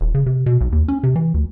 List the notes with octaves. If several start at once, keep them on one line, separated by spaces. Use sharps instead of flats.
D#1
C#3
C3
B2
B1
D#2
C#4
C3
E3
D2